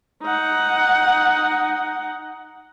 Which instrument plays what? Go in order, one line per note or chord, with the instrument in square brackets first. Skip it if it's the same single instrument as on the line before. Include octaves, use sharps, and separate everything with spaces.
[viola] D#4 F#5